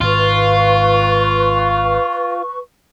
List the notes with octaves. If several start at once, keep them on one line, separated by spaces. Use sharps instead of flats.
G#1 G#2 F4 B4 C#6